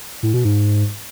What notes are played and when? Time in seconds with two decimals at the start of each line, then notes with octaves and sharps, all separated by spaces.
0.23 A2
0.34 B2
0.45 G#2